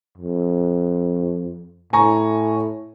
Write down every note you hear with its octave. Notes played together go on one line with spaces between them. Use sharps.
F2
A2 G#5 A#5 C#6